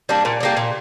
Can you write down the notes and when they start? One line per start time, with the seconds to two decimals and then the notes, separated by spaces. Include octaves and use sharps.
0.09 G3 A#3 D4
0.25 A#2
0.40 G3 A#3 D4
0.57 A#2